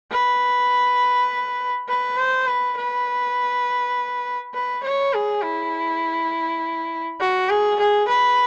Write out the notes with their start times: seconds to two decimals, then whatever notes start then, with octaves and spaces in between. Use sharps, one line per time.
0.11 B4
1.89 B4
2.17 C5
2.47 B4
2.77 B4
4.54 B4
4.83 C#5
5.13 G#4
5.43 E4
7.20 F#4
7.50 G#4
7.79 G#4
8.08 B4